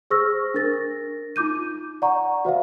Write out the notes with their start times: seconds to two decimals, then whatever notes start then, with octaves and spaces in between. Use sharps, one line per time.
0.10 G#4 C5 C#6 E6 F6 A#6
0.54 D4 A#4 A6 A#6
1.36 D#4 F4 D6 G6 D#7
2.02 D5 F#5 A#5 C#6
2.45 F#4 C5 E5 F5